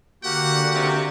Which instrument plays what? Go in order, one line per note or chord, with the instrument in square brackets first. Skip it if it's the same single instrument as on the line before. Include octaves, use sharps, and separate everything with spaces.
[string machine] D3 [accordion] A#3 F#4 G4 [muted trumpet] F#5
[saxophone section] C3